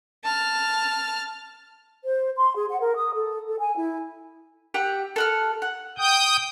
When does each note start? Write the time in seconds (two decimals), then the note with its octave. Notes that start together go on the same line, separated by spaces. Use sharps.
0.24 A5 F6
2.04 C5
2.36 C6
2.56 G#4
2.70 F#5
2.82 A#4
2.95 D#6
3.14 A4
3.47 A4
3.59 G#5
3.76 E4
4.74 G4 E5 F#5
5.16 A4 F#5 F6
5.62 F#5
5.98 G5 D#6 G6